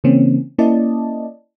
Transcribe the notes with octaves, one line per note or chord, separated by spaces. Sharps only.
C#3 E3 A#3 C4 C#4
A#3 C#4 E4 D5 D#5 A5